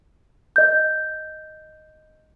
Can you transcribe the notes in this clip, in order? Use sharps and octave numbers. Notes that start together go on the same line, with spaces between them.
D#5 G6